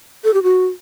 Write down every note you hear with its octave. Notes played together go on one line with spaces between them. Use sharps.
A4
G4
F#4